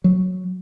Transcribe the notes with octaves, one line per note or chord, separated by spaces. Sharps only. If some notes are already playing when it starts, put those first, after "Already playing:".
F#3